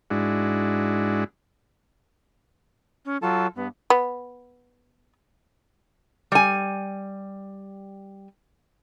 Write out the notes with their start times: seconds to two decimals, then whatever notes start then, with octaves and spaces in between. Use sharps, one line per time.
0.10 G#2 G#3 D4 E4 F#4
3.05 C#4
3.22 F#3 F4 A4 A5
3.56 G2 B3
3.90 B3
6.32 G3 G#5